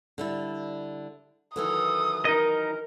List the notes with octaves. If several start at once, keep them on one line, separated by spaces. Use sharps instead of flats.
D3 G3 E4
D#3 E3 F#3 A4 D#6
D#4 A#4 D#5